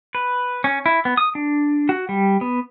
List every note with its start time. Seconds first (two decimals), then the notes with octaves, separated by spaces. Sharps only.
0.15 B4
0.64 C#4
0.86 E4
1.05 B3
1.17 D#6
1.35 D4
1.89 F#4
2.09 G3
2.41 B3